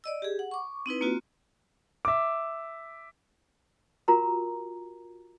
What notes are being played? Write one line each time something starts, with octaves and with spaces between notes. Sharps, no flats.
D5 D#5 E6
G4 G#4
F#5
C#6 D6
C4 D#4 E4 B4
A#3 C4 F4 F#4
E5 D6
F4 F#4 A#4 A#5 C6